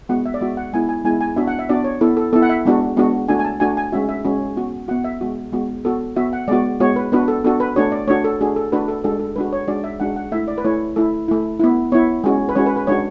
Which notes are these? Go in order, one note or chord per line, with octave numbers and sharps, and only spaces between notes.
G#3 B3 F#4 F#5
E5
D5
G#3 B3 F#4 E5
F#5
G#3 B3 E4 G#5
G#5
G#3 B3 E4 G#5
G#5
B3 D4 F#4 E5
F#5
E5
B3 D4 F#4 D5
C#5
B3 E4 A4
A4
B3 E4 A4
F#5
E5
G#3 B3 D4 F#4
G#3 B3 D4 F#4
A3 D4 F#4 G#5
G#5
A5
A3 D4 F#4 G#5
G#5
G#3 C#4 F#4 E5
E5
G#3 C#4 F#4
B3 F#4
B3 F#4 F#5
E5
G#3 B3 F#4
G#3 B3 F#4
B3 F#4 A4
B3 F#4 E5
F#5
G#3 B3 F#4 D5
G#3 B3 F#4 C#5
B4
B3 D4 F#4 B4
A4
B3 D4 F#4 A4
B4
A3 D4 F#4 C#5
D5
A3 D4 F#4 C#5
A4
A3 D4 F#4 G#4
A4
A3 D4 F#4 B4
A4
G#3 D4 F#4 A4
A4
G#3 D4 F#4 B4
C#5
G#3 D4 F#4 D5
E5
G#3 D4 F#4 F#5
F#5
A3 E4 E5
D5
B4
A3 E4 C#5
A3 E4 A4
A3 E4
B3 E4
B3 E4 C#5
G#3 C#4 F#4
B4
G#3 C#4 F#4 C#5
B4
B4
G#3 D4 F#4 C#5